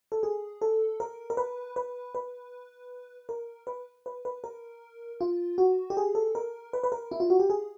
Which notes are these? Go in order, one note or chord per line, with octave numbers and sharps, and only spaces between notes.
A4
G#4
A4
A#4
A#4
B4
B4
B4
A#4
B4
B4
B4
A#4
F4
F#4
G4
G#4
A4
A#4
B4
B4
A#4
E4
F4
F#4
G4
G#4